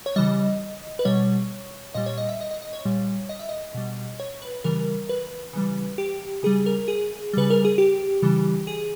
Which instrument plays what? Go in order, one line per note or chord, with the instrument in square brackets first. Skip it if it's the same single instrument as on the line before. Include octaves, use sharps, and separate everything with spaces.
[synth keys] C#5
C#3 E3 G3 D#5
B4
B2 G3 C#5
A#2 G3 D#5
C#5
D#5
E5
D#5
D#5
D#5
C#5
A#2 G3
D#5
E5
D#5
B2 G3
C#5
B4
C#3 E3 G3 A#4
B4
C#3 E3 G3
G4
C#3 G3 G#4
A#4
G#4
C#3 G3 B4
A#4
G#4
G4
C#3 E3 G3
G#4